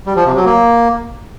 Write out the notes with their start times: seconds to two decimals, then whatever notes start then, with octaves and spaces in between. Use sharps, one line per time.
0.07 G3
0.16 F3
0.26 C3
0.35 F#3
0.45 A#3